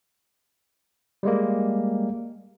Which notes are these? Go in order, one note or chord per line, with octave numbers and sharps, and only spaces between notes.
G3 G#3 A#3